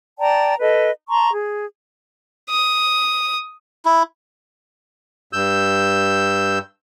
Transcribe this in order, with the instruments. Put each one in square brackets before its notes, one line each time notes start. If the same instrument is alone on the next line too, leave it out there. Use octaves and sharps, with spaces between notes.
[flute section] D5 G5 A5 A#5
A4 B4 D#5
A5 A#5 C6 C#6
G#4
[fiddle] D#6
[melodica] E4
[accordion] G2 E6 G6